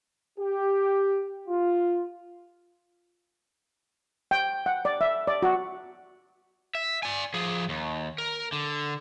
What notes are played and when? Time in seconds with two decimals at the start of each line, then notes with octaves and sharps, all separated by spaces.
0.39 G4
1.48 F4
4.31 G5
4.66 F#5
4.85 D5
5.01 E5
5.27 D5
5.43 F#4
6.75 E5
7.03 D5 G#5
7.34 F3 G#4
7.69 D#2
8.18 A#4
8.52 D3